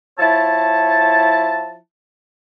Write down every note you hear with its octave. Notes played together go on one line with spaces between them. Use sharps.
F3 E4 C#5 A5